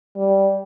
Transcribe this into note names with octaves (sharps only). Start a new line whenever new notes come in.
G3